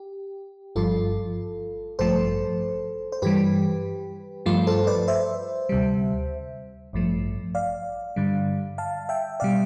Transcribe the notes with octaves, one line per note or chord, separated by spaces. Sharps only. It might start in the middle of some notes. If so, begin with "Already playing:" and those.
Already playing: G4
G1 G2 F3 F4 A4
A1 G2 F3 A3 A4 C5
C5
G2 E3 G3 G4 B4
G2 F3 A3 F4
A4 C5
B4 D5
C5 E5
D2 C3 G3
A1 G2 F3 A3
D5 F5
G2 D3 G3
F5 A5
E5 G5
B2 G3 D5 F5